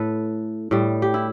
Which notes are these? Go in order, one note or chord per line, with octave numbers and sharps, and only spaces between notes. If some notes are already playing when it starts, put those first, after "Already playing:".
Already playing: A2 A4 B4
A2 G3
G4
E4